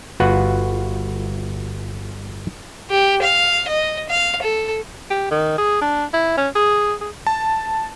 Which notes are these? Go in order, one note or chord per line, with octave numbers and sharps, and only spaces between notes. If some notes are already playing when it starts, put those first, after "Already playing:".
G1 F4 F#4 B4 F#5
G4
F5
D#5
F5
A4
G4
D#3
G#4
D4
E4
C#4
G#4
G#4
A5